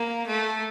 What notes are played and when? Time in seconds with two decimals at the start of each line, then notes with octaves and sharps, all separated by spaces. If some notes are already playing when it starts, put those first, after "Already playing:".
Already playing: A#3
0.27 A3